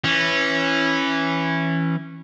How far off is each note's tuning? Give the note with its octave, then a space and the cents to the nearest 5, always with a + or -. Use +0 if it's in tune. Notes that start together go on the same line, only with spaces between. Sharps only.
E3 +0 C#4 -15